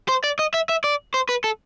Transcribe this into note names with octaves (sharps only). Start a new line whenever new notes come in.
C5
D5
D#5
E5
E5
D5
C5
B4
A4